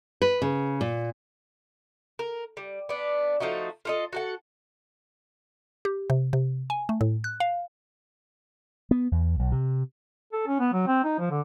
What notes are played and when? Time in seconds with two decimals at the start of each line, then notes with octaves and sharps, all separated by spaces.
0.22 B4
0.42 C#3
0.81 A#2
2.19 A#4
2.57 G3
2.89 B3 D4
3.40 F3 A3 D#4 F#4
3.85 F4 A4 D#5
4.13 F#4 A4 F#5
5.85 G4
6.10 C3
6.33 C3
6.70 G#5
6.89 A3
7.01 A2
7.24 F#6
7.40 F5
8.91 B3
9.12 E2
9.39 B1
9.52 C3
10.33 A4
10.47 C#4
10.60 B3
10.73 F#3
10.87 C4
11.04 D#4
11.19 F3
11.31 D3